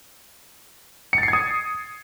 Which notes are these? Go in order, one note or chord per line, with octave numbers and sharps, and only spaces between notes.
C#7
A6
C7
G#6
D#6